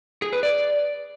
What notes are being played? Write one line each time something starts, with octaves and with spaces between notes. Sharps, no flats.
G#4
B4
D5